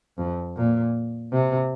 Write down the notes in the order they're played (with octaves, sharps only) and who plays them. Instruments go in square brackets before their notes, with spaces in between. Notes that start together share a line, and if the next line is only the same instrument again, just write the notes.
[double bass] F2
A#2
C3